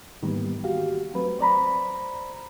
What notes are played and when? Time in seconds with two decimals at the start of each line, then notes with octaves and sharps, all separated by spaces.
0.22 G#2 D#3 E3 G3 A#3 B3
0.64 F#4 G4 F5
1.14 F#3 A3 C4 B4
1.39 C5 D5 A#5 B5